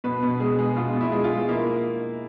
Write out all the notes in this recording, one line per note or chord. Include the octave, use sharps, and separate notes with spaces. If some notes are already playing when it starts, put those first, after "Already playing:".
B2 B4
B2
G#3 G#4
G#3
B2 F4
B2
E4
G#3
F4
G#3
A#3 E4